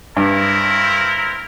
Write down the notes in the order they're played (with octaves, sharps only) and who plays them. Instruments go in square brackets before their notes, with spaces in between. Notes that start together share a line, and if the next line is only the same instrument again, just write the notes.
[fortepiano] G2 [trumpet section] C4 E4 A#4